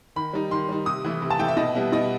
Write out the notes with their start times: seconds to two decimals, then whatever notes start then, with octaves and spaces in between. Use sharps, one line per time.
0.16 D#3 B5
0.33 G3 D#4
0.51 D#3 C6
0.69 G3 D#4
0.86 C3 D#6
1.04 E3 A3 E4
1.22 C3
1.30 A5
1.39 E3 A3 E4 G5
1.48 E5
1.57 B2 D#5
1.75 G3 B3 E4
1.92 B2 D#5